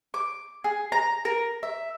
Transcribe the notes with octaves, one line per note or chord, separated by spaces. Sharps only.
D6
G#4
A#5
A#4
E5